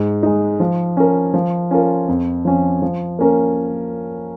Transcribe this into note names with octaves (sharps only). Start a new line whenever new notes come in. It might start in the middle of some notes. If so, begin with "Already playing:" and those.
Already playing: G#2
G#3 D#4
F3
C#4 A#4
F3
C#4 F4 A#4
F2
F3 C#4
F3
A#3 C#4 A#4